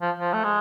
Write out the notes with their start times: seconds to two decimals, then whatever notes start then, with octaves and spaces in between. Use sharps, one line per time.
0.02 F3
0.20 F3
0.33 A3
0.44 G#3